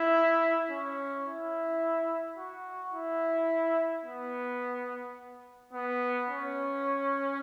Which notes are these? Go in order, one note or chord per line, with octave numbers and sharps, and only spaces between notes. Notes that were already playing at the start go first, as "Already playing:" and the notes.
Already playing: E4
C#4
E4
F#4
E4
B3
B3
C#4